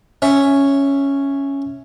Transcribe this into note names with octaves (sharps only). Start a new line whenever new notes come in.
C#4 E5